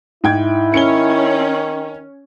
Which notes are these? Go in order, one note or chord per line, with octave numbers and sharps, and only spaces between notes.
G#2 E4 G5 G#6
D#3 C#4 C#7 G7